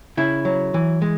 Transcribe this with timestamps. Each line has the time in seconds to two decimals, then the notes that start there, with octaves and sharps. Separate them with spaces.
0.17 C#3 E4
0.45 F#3
0.74 E3
1.02 G#3